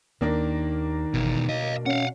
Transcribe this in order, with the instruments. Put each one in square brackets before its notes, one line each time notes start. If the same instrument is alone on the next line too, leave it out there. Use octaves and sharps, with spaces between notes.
[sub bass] D#2 [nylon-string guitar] D#3 [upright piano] A#3 D4 A#4
[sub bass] G1 [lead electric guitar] B2 E3
[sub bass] B2 [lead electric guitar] D#5 F5
[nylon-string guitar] C#4 [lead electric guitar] F5 F#5